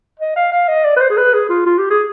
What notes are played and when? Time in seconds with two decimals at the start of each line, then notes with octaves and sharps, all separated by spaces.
0.20 D#5
0.36 F5
0.52 F5
0.68 D#5
0.85 D5
0.96 B4
1.01 C5
1.10 G#4
1.18 B4
1.34 G#4
1.49 F4
1.66 F4
1.79 G4
1.90 G#4